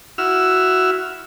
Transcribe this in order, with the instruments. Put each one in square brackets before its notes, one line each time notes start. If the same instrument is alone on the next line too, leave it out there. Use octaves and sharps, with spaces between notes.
[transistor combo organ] E4 F#4 E6 F6